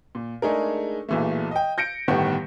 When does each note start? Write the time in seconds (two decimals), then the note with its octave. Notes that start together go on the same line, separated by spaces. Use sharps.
0.15 A#2
0.42 G#3 A3 D4 D#4 G#4 A#4
1.09 B1 A#2 E3 G#3 A3
1.51 D#5 G5
1.78 G6 A#6 C#7 D7
2.08 G1 A2 D#3 B3 G4 F#5